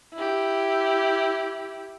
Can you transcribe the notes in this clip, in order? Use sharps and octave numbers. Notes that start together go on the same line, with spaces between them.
E4 G4